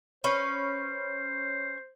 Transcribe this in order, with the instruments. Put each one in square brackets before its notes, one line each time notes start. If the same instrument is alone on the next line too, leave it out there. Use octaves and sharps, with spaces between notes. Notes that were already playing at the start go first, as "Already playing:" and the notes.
[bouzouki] C#4 B4 [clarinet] C5